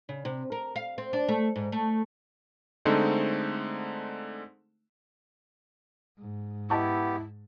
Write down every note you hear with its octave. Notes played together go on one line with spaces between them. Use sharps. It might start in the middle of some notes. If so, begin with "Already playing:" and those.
C#3
C3
A#4
F5
C4
D4
A3
G#2
A3
D3 G#3 A3 C4 D#4 C5
G#2
B3 E4 G4 D#5 A5 C#6